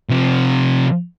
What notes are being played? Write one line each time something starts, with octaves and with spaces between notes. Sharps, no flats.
C3 F3